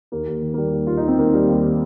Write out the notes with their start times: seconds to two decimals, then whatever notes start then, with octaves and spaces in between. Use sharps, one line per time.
0.12 D#2 A#3
0.27 D#2
0.42 D#3
0.54 A#3
0.57 D#3 G3
0.73 D#2
0.87 D#2 F4
0.97 D#4
1.03 D#3 C4
1.18 D#3 A#3
1.33 D#2 G3
1.48 D#2
1.64 D#3